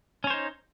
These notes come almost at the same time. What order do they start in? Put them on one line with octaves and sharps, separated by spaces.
C#4 C#5 C5 D#4